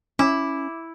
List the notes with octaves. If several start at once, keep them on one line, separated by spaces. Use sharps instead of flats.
C#4 E4 E5 D6